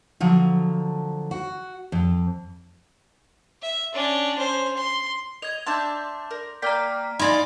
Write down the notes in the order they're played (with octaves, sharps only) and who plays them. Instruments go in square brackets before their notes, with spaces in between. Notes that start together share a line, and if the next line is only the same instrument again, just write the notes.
[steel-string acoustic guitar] D3 F3 F#3
F#4
F2
[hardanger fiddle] E5
C#4 D4
C#4 C5
C6
[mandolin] D#5 [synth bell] G#6 F7
[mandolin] D4 E5 A5 [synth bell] C6 D6 G6
[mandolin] A#4
[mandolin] A#3 D5 G5 [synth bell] A#5 F6 B6
[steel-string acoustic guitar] D#4 D5 [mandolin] F5 G#5 [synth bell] B5 C6 A#6